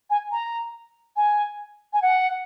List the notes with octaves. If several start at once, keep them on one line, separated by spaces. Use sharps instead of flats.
G#5
A#5
G#5
G#5
F#5